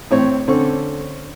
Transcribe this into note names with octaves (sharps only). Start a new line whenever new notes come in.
A2 C4 C#5
D3 C4 C#4 A4 C#6